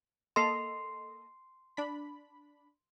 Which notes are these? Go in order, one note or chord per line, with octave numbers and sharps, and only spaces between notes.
A#3 A4 D#5 C6 C7
D4 B5